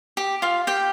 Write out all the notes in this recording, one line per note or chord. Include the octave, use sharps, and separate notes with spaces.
G4
F4 F5
G4 G5